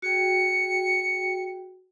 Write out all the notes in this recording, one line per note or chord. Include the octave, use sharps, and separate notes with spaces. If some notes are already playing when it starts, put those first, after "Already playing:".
F#4 G#4 G5 C#7